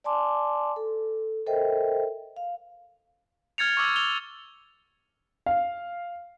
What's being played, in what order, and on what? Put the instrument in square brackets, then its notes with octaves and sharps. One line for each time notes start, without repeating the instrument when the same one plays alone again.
[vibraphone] D5 G#5 A5 C6 D6
A4
A4 A#4 C5 D#5 E5 G5
F5
[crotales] F6 G#6 A6 C#7 F7
C#6 D6 E6
F7 G7
[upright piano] F5